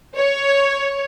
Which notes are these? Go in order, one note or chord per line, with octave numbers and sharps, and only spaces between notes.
C#5